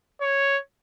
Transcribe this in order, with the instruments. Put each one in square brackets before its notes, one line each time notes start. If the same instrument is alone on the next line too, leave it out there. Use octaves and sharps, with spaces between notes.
[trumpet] C#5